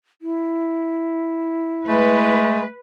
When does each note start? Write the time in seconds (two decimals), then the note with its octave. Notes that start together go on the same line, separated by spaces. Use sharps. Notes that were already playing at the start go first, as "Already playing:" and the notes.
0.22 E4
1.88 G#3 A3 B4